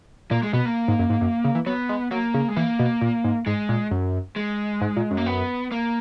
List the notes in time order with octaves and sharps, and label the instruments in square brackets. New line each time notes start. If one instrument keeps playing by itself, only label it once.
[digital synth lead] A#2 [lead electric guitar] A#3
[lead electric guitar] G#3
[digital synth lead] B2 [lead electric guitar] B3
[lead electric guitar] A#3
[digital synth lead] G#2
F#2
G#2
F#2
C#3
E3
[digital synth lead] F#3 [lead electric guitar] B3
[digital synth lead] G#3
[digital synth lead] F#3 [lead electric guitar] A#3
[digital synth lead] C#3
[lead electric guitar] G#3
[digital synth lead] E3 [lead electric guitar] A#3
[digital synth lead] B2
A#2
G#2
[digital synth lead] G#2 [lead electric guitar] G#3
[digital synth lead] A#2
F#2
[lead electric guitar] G#3
[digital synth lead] G#2
A#2
F#2
[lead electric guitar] A#3
B3
A#3